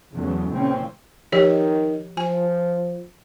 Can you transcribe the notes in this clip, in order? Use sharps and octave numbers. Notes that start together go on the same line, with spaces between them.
E2 C#3 E3 F#3 A3
C#2 A#2 E3 C4 C#4
D#3 F3 G4 C#5
F3 G#5